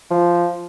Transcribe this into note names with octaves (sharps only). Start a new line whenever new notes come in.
F3